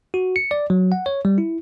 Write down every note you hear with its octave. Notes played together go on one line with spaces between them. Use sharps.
F#4
C#7
D5
F#3
F#5
C#5
G3
E4